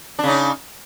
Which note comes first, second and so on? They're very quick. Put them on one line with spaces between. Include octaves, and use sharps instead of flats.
D4 C#3 D#4